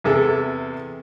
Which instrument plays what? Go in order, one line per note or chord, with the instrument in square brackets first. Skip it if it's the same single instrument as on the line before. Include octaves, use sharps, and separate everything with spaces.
[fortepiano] E2 C3 G#4 A4